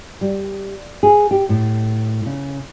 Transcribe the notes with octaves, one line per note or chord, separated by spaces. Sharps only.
G3
G#4
G4
A2
C#3